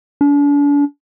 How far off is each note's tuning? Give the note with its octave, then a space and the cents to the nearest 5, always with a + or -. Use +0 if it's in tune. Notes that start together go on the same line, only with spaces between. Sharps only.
D4 -40